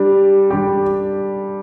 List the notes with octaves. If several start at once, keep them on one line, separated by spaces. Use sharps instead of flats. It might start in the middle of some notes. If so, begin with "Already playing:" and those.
Already playing: G3 D4 G4
G3 D4 G4